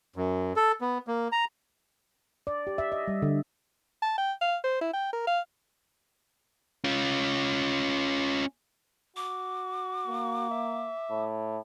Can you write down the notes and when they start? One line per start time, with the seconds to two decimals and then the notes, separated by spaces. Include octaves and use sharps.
0.16 F#2
0.56 A4
0.81 B3
1.07 A#3
1.32 A#5
2.47 D5
2.67 G4
2.78 E5
2.92 D#5
3.08 G3
3.22 D3
4.02 A5
4.18 G5
4.41 F5
4.64 C5
4.81 E4
4.93 G5
5.13 A#4
5.27 F5
6.84 C#4 F4
9.16 F#4 D6
10.07 A#3
10.50 E5
11.10 A2